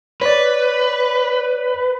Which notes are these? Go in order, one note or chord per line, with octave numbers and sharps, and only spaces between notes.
B4 C#5 D5